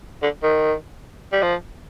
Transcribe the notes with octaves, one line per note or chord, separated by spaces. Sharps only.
D3
D#3
G3
F3